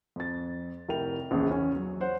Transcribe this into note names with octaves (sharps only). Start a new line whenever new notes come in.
F2 A6
F1 E4 A#4 G5 F7
A#1 E2 C#3
E2 C#4
F#3
C5 C#5 F#5